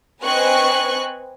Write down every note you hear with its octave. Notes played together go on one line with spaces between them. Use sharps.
C4 B4 D#5 G#5 C#6 F#6